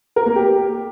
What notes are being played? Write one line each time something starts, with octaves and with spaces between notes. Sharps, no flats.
A#4
A#3
G4